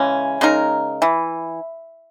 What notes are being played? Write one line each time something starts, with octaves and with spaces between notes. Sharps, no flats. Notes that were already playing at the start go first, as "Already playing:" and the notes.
Already playing: C#3 E3 G#3 C#4
C#3 G#3 D#4 A#4
E3